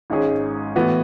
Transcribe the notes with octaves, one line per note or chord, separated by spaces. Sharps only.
G#1 G#2 G#3 C#4 G#4
A2 E3 B3 F#4